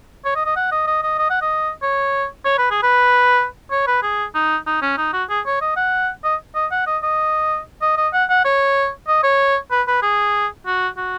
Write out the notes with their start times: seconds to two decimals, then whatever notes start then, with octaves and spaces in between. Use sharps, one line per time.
0.25 C#5
0.35 D#5
0.46 D#5
0.56 F#5
0.72 D#5
0.87 D#5
1.03 D#5
1.19 D#5
1.30 F#5
1.42 D#5
1.82 C#5
2.45 C#5
2.58 B4
2.71 G#4
2.83 B4
3.71 C#5
3.87 B4
4.03 G#4
4.35 D#4
4.66 D#4
4.82 C#4
4.97 D#4
5.13 F#4
5.30 G#4
5.46 C#5
5.61 D#5
5.76 F#5
6.24 D#5
6.55 D#5
6.71 F#5
6.87 D#5
7.03 D#5
7.82 D#5
7.97 D#5
8.13 F#5
8.30 F#5
8.45 C#5
9.08 D#5
9.23 C#5
9.71 B4
9.87 B4
10.03 G#4
10.66 F#4
10.97 F#4